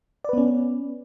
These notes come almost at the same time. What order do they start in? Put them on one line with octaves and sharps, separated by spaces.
D5 B4 B3 C#4